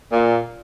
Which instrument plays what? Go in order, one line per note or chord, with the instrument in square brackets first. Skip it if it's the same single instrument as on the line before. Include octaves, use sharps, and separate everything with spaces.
[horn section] A#2